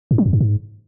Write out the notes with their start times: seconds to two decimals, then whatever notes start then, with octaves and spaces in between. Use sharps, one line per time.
0.11 G#2
0.18 F#3
0.26 F2
0.33 G2
0.41 G#2